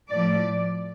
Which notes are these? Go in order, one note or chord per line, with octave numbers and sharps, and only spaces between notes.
A2 F3 A3 D5